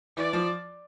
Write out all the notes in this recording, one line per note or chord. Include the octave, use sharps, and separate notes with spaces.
E3 D5
F3